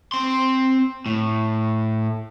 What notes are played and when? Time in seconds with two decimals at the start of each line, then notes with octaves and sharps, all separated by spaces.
0.12 C4 C6
1.06 A2